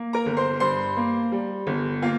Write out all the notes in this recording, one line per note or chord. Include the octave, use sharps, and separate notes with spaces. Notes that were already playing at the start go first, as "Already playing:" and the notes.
Already playing: A#3
A#4 A#5
G1
C5 C6
G2 C5 C6
A#3
G3
G1
A#3 F4 F5